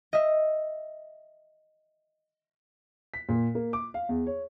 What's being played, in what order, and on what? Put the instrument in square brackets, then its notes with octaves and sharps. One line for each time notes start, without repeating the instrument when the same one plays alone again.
[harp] D#5 E5
[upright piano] B6
A#2
A#3
D6
F5
E2
C#5